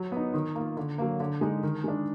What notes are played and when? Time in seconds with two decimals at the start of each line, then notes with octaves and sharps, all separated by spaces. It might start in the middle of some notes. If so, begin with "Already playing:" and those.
Already playing: F#3
0.12 B3 D#4
0.34 D#3
0.55 A#3 F4
0.77 D3
0.98 F#3 A#3
1.20 D3
1.41 G#3 D#4
1.63 D#3
1.84 G#3 D4